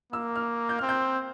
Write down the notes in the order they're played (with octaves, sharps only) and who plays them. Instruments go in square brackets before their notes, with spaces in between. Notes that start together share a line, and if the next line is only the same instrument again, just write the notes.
[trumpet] A#3 [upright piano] E6
[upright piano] F6
G6
[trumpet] C4 [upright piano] F6
[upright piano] G6